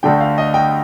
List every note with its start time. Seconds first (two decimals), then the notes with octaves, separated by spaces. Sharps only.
0.03 D2 D3 A3 G5
0.21 F5
0.38 D#5
0.54 G5